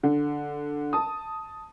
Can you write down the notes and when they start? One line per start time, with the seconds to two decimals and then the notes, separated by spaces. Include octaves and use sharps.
0.03 D3
0.93 A5 D#6